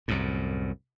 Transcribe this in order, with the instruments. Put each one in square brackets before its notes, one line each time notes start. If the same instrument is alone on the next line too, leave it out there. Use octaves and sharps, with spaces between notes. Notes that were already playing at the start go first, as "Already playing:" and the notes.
[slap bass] C2 F#2 A2